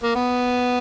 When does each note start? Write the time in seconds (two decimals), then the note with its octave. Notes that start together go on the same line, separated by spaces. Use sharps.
0.03 A#3
0.15 B3